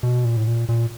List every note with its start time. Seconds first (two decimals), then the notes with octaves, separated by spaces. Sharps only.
0.03 B2
0.24 A#2
0.37 A2
0.47 A#2
0.69 A#2